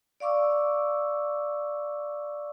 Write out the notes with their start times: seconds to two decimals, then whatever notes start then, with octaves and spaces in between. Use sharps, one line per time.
0.20 D5 F5 C#6 D6 E6